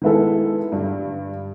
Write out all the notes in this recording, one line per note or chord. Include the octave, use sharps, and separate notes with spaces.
D#3 G#3 B3 E4 A4
G2 D3 G3